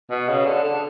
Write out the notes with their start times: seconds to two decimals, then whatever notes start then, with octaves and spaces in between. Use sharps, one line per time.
0.11 B2
0.29 C#3
0.46 D3
0.64 D3